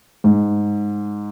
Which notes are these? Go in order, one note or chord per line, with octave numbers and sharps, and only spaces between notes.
G#2